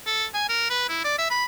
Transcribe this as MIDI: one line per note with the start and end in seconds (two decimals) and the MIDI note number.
0.06 0.25 69
0.34 0.44 80
0.49 0.66 70
0.70 0.86 71
0.89 1.03 64
1.04 1.18 74
1.18 1.30 76
1.30 1.45 83